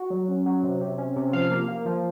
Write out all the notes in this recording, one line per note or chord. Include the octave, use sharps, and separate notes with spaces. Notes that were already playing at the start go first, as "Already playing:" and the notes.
Already playing: F#4
F#3
C#4
F#3
C3
C3
C#4
C3
F3 F5
A#3
A#3
F3